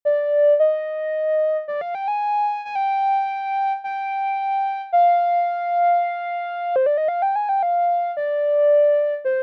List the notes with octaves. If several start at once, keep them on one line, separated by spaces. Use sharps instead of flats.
D5
D#5
D5
F5
G5
G#5
G#5
G5
G5
F5
C5
D5
D#5
F5
G5
G#5
G5
F5
D5
C5